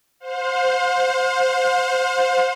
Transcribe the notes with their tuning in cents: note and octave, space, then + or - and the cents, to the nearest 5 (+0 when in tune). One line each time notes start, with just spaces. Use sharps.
C5 +0 F5 +45